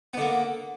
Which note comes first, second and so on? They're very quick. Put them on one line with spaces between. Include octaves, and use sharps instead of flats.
B3 D3 A#3